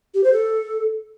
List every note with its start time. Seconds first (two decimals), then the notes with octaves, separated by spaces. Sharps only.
0.14 G4
0.24 C5
0.33 A4